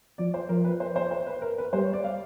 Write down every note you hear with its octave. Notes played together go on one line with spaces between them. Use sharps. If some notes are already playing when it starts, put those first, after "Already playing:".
F3 D5
C5
F3 A#4
B4
C5
C5
C5
B4
A#4
B4
G3 C5
C#5
D5
F5